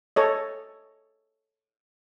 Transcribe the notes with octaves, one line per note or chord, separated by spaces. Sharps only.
A4 C#5 D#5